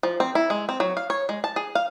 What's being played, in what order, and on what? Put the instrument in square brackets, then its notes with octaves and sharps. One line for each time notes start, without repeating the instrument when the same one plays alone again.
[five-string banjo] F3
C4
E4
G#3
C4
F#3
F5
C#5
G#3
A5
G#4
F5